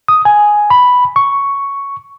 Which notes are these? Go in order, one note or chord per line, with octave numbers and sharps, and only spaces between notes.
D#6
G#5
B5
C#6